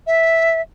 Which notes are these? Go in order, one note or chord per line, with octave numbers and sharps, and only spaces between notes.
E5